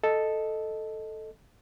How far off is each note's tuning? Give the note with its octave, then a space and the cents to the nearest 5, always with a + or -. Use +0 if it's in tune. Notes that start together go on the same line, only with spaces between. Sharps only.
A4 +0 D#5 +0